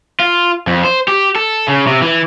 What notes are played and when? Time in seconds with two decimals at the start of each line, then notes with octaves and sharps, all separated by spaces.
0.20 F4
0.67 F2
0.85 C5
1.08 G4
1.36 A4
1.68 C#3
1.87 C3
2.02 E3